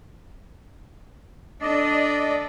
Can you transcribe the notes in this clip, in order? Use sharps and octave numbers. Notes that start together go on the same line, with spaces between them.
D4 A4 D5 D#5